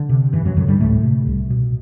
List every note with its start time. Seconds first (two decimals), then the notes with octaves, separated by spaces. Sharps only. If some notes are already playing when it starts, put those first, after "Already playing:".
Already playing: D3
0.09 C3
0.33 F#2 E3
0.45 F#2 F#3
0.57 F#2 D3 F#3
0.68 G2 G3
0.80 D2 A2 A3
1.03 C3
1.27 C2
1.50 B2